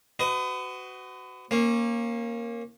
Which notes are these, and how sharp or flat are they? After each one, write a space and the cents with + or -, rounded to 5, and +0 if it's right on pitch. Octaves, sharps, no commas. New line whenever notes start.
F#4 +15 B4 +40 D#5 +0
A#3 +0 C#4 -30